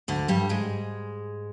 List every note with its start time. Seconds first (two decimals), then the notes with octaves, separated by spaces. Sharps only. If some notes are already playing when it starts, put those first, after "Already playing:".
0.08 D2 D3
0.28 G2 G3
0.49 G#2 G#3